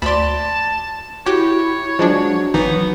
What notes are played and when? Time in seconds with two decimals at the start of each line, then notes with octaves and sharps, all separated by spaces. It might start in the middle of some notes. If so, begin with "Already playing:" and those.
0.02 D2 D5 A5 B5 C6
1.26 E4 F#4 G4 C#5
1.99 F3 F#3 G#3 D4
2.54 G#1 E3 B3 D#4